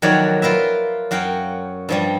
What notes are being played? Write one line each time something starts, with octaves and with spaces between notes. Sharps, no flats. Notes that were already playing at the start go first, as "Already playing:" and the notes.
F2 D#3 F#3 C#5 D5
F4 A#4 B4 E5
F#2 F#4 F5 G5
G2 F3 G3